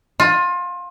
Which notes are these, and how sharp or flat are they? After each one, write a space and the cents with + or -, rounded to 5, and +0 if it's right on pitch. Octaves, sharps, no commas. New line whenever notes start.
F4 +25